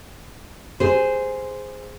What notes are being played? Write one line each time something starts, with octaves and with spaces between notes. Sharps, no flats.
G#4 C5